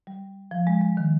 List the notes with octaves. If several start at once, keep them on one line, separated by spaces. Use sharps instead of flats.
G3
F3
G#3
G#3
D#3